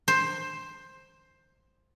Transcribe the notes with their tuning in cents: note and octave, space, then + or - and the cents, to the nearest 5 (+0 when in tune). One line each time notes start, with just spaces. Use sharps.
C5 +10